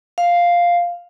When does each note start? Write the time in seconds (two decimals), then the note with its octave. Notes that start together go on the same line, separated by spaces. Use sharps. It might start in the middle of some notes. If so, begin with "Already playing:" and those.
0.18 F5